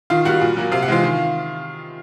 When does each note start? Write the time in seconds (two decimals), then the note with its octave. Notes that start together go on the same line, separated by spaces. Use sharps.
0.10 D#3 F4 F5
0.25 G3 A#3 F#4 F#5
0.41 A#2
0.57 F#3 A#3
0.72 C3 F5
0.82 F#5
0.88 E3 G#3 C4 F4 F5
1.03 D#3